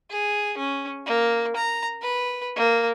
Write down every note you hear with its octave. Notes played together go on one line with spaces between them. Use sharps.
G#4
C#4
A#3
A#5
B4
A#3